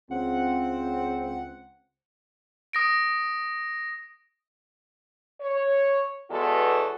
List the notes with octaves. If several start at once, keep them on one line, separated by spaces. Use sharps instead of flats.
C#2 C4 F#5
D#6 A#6 D7
C#5
E2 G#3 B3 F#4 A4